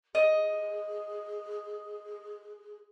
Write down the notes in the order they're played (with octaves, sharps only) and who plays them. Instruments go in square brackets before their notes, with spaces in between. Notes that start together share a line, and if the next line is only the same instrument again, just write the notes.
[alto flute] G#4 [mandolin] D#5